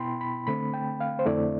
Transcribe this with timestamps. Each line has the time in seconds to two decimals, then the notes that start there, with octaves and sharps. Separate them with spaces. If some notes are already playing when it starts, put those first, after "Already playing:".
Already playing: B2 B3 E4 G5 B5 C6
0.21 B5
0.47 D3 A3 C4 B5
0.73 G5
1.00 F5
1.19 C5
1.26 F2 D3 A3 C4 E4 D5